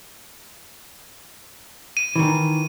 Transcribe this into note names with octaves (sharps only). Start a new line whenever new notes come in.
D#7
D#3 E3